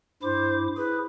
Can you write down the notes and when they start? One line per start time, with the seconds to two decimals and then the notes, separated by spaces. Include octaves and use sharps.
0.23 G2 E4 C5 D6
0.77 E4 G#4 B4